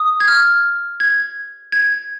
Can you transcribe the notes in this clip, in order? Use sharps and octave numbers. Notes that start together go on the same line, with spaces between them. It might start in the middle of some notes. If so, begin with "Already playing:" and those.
Already playing: D#6
G#6
F6
G#6
G#6